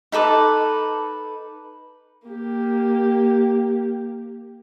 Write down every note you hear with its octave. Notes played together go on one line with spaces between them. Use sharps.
D#4 A4 B4 D6
A#3 G4